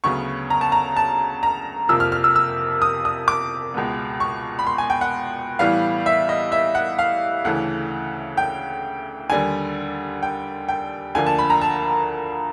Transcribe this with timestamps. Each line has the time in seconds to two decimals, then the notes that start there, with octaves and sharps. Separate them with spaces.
0.04 D2 C#3 F#3 B3 C#6
0.50 A#5
0.61 A5
0.72 A#5
0.97 A5
1.43 A#5
1.89 F2 C3 F3 A#3 E6
2.00 F6
2.12 F6
2.24 E6
2.36 E6
2.82 D#6
3.05 D#6
3.28 D6
3.74 C#2 B2 G#3 B3
4.20 C#6
4.59 B5
4.67 C6
4.78 G#5
4.90 G5
5.01 F#5
5.59 A2 E3 G3 B3 F5
6.06 E5
6.29 D#5
6.52 E5
6.75 F#5
6.99 F5
7.45 D2 C#3 E3 A3 F#5
8.37 G5
9.30 D#2 D3 G3 G#5
10.23 G5
10.69 G5
11.15 D2 D3 F3 A#3 G#5
11.26 A5
11.38 B5
11.50 A#5
11.62 A5